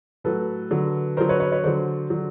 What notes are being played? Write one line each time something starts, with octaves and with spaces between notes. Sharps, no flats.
A2 F#3 A4 B4
D3 F#3
D3 F#3 A#4 C5
B4 C#5
B4 C#5
B4 C#5
D3 F#3 C5 D5
D3 F#3